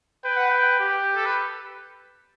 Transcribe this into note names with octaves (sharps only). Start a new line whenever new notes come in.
B4 G5
F#5
G5
G4
A4
B4